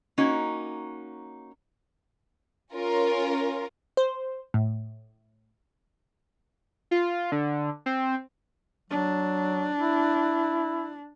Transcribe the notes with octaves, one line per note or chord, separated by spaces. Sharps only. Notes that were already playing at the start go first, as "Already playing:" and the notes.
A#3 C#4 D#4 F#4
C#4 F4 A#4
C5
A2
F4
D3
C4
F#3 D4
E4